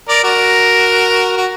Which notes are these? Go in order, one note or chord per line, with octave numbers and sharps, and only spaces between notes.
A#4 D5
F#4 A#4
F#4